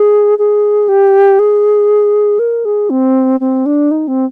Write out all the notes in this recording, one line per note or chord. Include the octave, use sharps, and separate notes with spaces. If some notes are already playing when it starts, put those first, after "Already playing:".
Already playing: G#4
G#4
G4
G#4
A#4
G#4
C4
C4
D4
D#4
C4